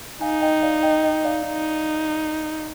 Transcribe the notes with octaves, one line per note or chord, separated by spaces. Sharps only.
D#4 F5 G#5
D#5 G5
D5 F5
D#5 G5
D#5 G5
D5 F5
D#4